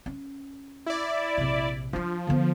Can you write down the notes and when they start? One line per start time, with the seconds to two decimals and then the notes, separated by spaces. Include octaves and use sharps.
0.06 C#4
0.86 E4 D5
1.38 A#1 C3
1.93 F3 D4 F4
2.27 D3 B3